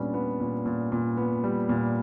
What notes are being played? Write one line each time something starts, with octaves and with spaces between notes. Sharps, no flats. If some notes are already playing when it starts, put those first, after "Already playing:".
Already playing: A#2 G3 B3 C#4 D4
B3
A#2
A#2
A#2
B3
G3
A#2